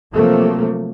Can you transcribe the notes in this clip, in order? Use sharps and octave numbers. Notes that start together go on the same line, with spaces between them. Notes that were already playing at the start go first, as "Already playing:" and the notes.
C3 F3 F#3 A3 A#3